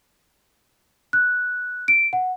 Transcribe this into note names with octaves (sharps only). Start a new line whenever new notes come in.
F#6
D7
F#5